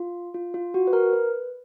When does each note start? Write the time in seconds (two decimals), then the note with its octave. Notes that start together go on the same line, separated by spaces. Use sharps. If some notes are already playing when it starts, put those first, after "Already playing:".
Already playing: F4
0.34 F4
0.54 F4
0.74 F#4
0.87 B4
0.93 A#4
1.13 B4